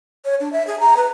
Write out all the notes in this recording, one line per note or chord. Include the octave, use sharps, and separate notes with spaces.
C#5
D4
E5
G#4
A#5
B4